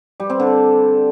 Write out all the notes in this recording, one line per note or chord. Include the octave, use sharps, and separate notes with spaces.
G3
C4
D3